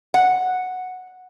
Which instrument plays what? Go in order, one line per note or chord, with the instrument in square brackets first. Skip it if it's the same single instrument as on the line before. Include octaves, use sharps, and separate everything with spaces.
[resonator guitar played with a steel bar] F#5